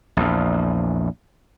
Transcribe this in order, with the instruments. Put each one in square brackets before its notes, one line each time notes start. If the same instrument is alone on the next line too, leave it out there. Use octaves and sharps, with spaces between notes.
[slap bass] A#1 E2